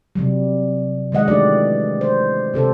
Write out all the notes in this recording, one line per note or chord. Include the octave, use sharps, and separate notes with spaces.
C3 F#3 G3
D#3 G#3 D#5 F#5
E3 A3 D4 F#4 G4 D5
C5
C3 G4 A4 C5